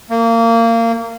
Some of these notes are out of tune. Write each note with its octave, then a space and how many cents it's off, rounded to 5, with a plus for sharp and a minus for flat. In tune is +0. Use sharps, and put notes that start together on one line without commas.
A#3 -25